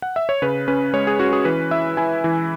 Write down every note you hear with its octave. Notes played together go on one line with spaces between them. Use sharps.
F#5
E5
C#5
C#3 B4
C#4 B4
G#3 C#5
G#4
C#4 F#4
G#4
E3 B4
E4 E5
E4 G#5
E3